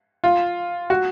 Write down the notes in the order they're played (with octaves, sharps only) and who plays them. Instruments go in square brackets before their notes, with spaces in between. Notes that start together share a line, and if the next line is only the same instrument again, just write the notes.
[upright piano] F4
F#4